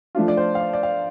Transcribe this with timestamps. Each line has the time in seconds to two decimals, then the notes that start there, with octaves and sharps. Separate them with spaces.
0.15 F3 A3 D4 F4
0.28 D5
0.37 C5
0.55 F5
0.61 D5
0.73 D5
0.83 F5